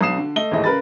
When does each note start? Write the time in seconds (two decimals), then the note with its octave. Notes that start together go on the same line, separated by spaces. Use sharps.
0.01 B1 D3 B3 D#6 C7 E7
0.18 D3
0.36 A3 D#5 G7
0.51 D#2 G#2 E3 A3 D#5
0.64 C#3 A#4 B4 B5 A6